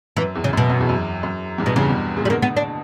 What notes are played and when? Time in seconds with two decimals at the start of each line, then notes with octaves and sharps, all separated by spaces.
0.17 F#2 E3
0.35 E2
0.44 C#3
0.53 F#2 B2
0.70 F#2
0.80 E2
0.89 F#2
1.23 F#2
1.58 E2 G2
1.66 B2
1.76 E2 G2 C#3
1.89 G2 B2
2.16 A#2 C#3
2.25 G3
2.30 B2 D3 A#3
2.42 B3
2.57 D4